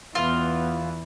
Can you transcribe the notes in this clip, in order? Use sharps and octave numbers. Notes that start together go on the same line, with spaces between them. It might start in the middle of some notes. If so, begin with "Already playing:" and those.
E2 E3 B3 F4